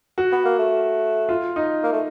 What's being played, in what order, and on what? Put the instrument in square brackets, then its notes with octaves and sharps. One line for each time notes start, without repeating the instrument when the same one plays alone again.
[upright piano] F#4
[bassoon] B3
A#3
A3
[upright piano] F4
D#4
[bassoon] A#3
A3